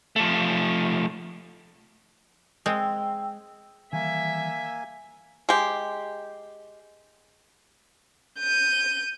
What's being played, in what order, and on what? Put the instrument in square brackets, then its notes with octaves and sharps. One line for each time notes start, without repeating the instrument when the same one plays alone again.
[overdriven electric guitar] F3 A3
[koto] G#3 C4 [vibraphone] G5 E6
[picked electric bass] D#3 E3 G3 [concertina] A#3 G#5 [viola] E5
[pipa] G#3 G4
[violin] G6 D#7